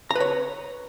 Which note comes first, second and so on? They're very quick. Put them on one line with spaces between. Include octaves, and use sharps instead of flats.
A#5 B4 C#5